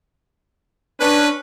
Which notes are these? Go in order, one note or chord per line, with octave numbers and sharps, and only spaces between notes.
C#4 D4 B4